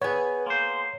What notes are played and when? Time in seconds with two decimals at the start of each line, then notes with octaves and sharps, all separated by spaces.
0.02 B3 G#4 B4 C#5
0.46 A#3 C5 C6